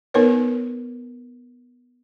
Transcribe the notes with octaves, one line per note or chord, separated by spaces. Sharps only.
B3 D#4 A#4 B4 C#5